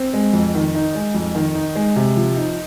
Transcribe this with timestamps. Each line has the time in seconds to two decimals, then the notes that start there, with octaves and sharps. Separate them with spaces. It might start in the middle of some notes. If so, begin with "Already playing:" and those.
Already playing: C4
0.14 G#3
0.33 F2
0.55 D#3
0.75 D#4
0.95 G#3
1.15 F2
1.35 D#3
1.55 D#4
1.75 G#3
1.96 C3
2.16 F3
2.36 D#4